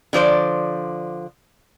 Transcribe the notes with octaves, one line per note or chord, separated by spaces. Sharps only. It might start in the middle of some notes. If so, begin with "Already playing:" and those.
D3 F3 C5 D5